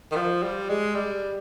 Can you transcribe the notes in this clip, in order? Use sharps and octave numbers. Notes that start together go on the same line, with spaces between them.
D#3
F3
G3
G#3
G3